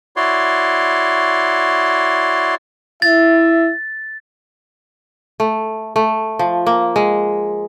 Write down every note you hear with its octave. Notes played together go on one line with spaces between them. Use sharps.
E4 F#4 C#5 D5 C6
E4 E5 A6
A3
A3
F3
A#3
G#3